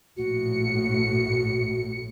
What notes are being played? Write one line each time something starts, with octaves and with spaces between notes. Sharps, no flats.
A#1 A2 F#4 C#7